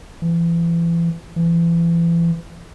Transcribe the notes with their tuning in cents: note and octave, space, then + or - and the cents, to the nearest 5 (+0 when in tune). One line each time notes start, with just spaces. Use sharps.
E3 +35
E3 +35